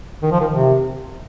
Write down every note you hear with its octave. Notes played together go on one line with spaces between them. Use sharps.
D#3
F3
D#3
C3